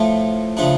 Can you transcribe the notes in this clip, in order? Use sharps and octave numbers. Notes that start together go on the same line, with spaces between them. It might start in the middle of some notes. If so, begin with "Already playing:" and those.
Already playing: A2 F3 A3
C#3 F3 A3 D4